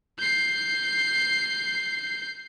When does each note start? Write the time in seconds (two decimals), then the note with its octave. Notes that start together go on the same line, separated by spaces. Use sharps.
0.19 G6 C7